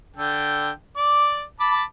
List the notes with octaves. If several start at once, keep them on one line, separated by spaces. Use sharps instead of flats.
D3 A4 G5
D5 D6
A5 B5 D6